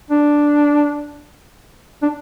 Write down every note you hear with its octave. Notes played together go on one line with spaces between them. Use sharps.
D4
D4